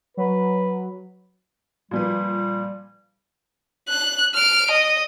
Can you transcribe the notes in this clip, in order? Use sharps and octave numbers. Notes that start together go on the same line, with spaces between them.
F#3 B4
A#2 F3 G3 B4
F#6
F6 D7
D#5